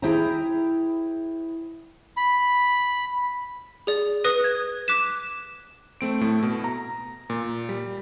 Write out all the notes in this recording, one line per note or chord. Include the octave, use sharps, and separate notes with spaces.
E4 G#4 C5 E5 G5 A#5
B5
G#4 D5
B4 D#6 F#6 A#6 D#7
G#6
D6 F#6 B6 E7
A3 C4 D7
A2 A3
B2
A#5
A#2
G3